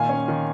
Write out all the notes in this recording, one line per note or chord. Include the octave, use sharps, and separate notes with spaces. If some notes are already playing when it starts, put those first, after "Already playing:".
Already playing: A#2 D#3 F5 G#5
C#4
D#3